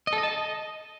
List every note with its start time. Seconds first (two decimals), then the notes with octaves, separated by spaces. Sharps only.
0.07 D#5
0.13 A4
0.18 D#5
0.23 A5
0.29 D#5